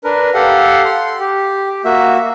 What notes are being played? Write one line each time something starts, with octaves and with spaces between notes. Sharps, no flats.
D4 A#4 B4
G4 A4 F5 F#5
C6
G4
A#3 F#4 E5